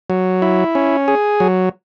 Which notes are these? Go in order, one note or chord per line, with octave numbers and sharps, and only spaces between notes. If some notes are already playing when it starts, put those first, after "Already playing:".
F#3
E4
C#4
G#4
F#3